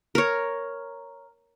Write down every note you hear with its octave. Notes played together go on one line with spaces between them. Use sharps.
A#4 C#5